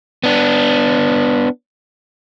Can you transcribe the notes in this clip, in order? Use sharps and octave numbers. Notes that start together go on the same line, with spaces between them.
B3 D4